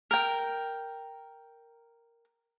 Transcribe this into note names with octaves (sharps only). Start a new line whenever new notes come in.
A#4 G5